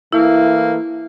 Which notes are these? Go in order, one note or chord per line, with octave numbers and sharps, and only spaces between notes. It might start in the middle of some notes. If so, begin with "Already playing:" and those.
E3 A3 A#3 E4